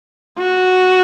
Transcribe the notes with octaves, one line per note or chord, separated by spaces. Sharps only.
F#4